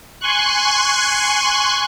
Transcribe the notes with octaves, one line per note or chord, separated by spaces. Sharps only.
G#5 C6 C#6 F#6